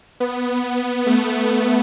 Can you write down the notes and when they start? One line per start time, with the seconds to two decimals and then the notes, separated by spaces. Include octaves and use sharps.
0.20 B3
1.06 A3
1.50 B3